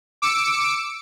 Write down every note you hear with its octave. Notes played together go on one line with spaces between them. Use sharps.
D6 E6 C#7 D7